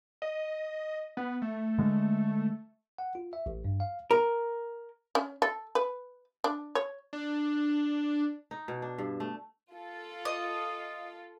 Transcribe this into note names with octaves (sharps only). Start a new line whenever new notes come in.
D#5
B3
A3
D3 G#3
F#5
F4
E5
A1
G2
F5
A#4
C#4
A4
B4
D4
C#5
D4
D#4
B2
D4
G2
A3
F4 A4
D#5